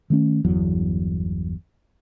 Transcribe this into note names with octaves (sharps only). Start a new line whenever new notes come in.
D#3 A3 C#4
G1 E2 F#3